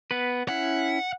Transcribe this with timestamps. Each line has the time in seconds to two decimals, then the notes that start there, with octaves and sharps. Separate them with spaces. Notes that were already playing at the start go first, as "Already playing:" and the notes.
0.11 B3 B4
0.49 C#4 E4 F#5